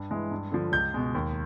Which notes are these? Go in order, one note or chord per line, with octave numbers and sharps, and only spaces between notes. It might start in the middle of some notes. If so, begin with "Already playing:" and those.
Already playing: G2
E3 G#3
G2
D3 F3
C#2 G6
B2 G#3
D#2